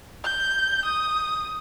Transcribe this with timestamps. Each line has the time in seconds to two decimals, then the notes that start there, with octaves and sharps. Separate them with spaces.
0.24 G6
0.86 D#6